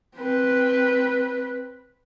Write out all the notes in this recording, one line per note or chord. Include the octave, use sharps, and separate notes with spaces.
C4 B4